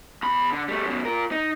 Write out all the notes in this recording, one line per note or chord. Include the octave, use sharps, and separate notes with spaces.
E2 B5
D3
G3 A3
F#2 B2
F4 A#4
D#4